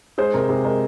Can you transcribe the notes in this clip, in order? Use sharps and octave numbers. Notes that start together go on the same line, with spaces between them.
G#3 G#4 C5
C3 A#4
C3 G#4
G#3 A#4